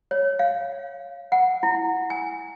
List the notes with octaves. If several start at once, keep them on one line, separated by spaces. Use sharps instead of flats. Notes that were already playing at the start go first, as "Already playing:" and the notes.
C#5
F5
F#5
E4
G#5